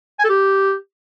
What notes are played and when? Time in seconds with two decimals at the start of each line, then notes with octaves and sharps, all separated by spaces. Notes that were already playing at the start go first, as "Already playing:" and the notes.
0.19 G#5
0.24 A4
0.29 G4